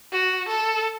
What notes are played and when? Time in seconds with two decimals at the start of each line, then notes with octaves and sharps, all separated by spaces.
0.12 F#4
0.48 A4